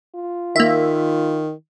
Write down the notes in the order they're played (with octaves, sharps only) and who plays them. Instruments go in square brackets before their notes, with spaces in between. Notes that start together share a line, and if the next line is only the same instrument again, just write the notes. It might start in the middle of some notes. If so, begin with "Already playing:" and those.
[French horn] F4
[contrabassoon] D#3 [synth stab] A#3 E5